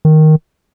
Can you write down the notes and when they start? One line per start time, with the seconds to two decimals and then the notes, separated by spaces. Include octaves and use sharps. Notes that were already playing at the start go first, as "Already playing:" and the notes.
0.05 D#3